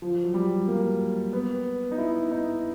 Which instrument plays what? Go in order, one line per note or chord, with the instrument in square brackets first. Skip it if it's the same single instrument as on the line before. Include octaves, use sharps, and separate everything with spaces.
[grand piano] F3
F#3
G3
A#3
B3
D#4
E4
D#4